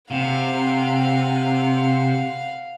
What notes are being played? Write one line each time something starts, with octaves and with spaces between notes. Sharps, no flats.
C3 F5 F#5